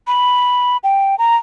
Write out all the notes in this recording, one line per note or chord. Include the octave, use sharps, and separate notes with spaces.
B5
G5
A#5